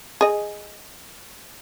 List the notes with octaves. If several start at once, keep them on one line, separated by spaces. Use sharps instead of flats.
G#4 D#5